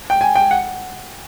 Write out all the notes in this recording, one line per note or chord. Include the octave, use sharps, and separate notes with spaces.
G5
G#5
G5
F#5